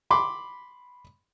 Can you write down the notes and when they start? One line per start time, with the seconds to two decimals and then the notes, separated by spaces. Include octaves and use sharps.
0.10 B5 C6 D6